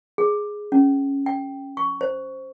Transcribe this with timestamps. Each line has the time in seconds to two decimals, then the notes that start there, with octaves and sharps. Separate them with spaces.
0.18 G#4
0.72 C#4
1.26 G5
1.77 C#6
2.01 C5